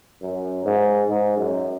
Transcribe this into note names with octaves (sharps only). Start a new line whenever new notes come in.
F#2
G#2
G#2
F#2